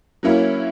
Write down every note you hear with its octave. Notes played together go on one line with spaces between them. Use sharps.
F#3 A#3 C#4 E4